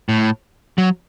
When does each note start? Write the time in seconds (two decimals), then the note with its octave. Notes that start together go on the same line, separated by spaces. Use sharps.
0.09 A2
0.78 F#3